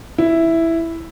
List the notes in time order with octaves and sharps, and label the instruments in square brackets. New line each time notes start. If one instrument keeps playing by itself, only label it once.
[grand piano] E4